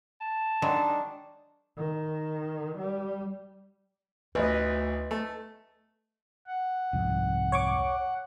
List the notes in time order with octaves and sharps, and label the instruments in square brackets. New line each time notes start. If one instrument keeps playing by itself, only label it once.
[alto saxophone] A5
[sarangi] D#3 [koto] F#3 G#3 [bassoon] D4
[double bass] D#3
G3
[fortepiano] A1 [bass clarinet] D2 [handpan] B4 D#5
[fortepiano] A3
[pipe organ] F#5
[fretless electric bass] C2 F2 G#2
[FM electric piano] C#5 C#6 D6